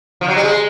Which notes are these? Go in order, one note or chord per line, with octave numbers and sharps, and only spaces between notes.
F3
F#3
G3
G#3